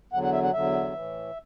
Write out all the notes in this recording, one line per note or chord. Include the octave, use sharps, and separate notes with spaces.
E2 D3 F#3 F#5
F#5
E5
F#5
E2 D3 F#3 E5
A2 E3